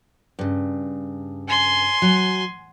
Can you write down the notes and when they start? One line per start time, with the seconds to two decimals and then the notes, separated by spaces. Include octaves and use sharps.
0.39 G2 C#3
1.48 G#5 C6
2.02 F#3